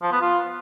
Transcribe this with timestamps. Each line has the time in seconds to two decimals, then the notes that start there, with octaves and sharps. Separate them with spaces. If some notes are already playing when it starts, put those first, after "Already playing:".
0.02 F3
0.12 B3
0.22 F4